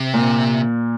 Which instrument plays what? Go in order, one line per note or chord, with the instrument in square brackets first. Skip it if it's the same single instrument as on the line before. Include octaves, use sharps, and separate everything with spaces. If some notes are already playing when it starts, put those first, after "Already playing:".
Already playing: [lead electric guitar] C3
[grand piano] A#2